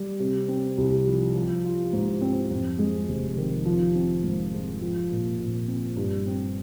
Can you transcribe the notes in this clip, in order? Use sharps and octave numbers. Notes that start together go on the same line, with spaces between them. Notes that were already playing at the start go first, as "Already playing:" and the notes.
Already playing: G3
C3
C4
C2
F3
F3
F4
G#2
C4
F2
G#3
F1
D#3
F3
C4
G#2
G#3
F3
A#2
A#2
C4
G2
C4